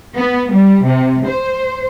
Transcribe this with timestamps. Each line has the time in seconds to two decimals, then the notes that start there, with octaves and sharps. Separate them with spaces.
0.15 B3
0.52 G3
0.84 C3
1.27 C5